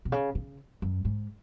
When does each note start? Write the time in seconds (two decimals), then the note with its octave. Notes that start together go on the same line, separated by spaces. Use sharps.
0.05 B2
0.12 C#3
0.35 C#3
0.82 F#2
1.05 G#2